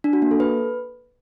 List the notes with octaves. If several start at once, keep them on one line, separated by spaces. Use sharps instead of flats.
D4
F#4
A#3
A4
B4